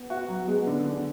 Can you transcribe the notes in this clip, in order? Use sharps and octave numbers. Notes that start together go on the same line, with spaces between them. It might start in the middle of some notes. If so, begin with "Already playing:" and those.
Already playing: B3
F#4
F#3
G#3 B3
D3
D3